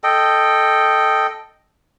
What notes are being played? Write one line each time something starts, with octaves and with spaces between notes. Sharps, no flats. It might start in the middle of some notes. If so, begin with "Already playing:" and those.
A4 D#5 G5